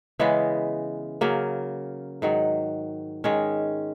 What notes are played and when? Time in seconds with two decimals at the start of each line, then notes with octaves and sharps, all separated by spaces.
0.20 C#3 E3 G#3 B3
1.21 C#3 F#3 A#3
2.22 G#2 D#3 F#3
3.24 D#3 G#3 C#4